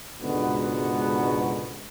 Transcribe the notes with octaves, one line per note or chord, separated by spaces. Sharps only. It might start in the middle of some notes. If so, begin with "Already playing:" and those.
C#2 G#2 B2 D3 B3 F#4